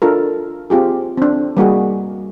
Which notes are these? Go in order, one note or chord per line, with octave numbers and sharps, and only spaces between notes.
D4 F4 A4 A#4
C4 F4 G4 G#4
C4 D4
G3 A#3 F#4 G#4